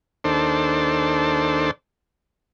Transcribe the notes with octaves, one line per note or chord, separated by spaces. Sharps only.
D#2 D4 A4 C5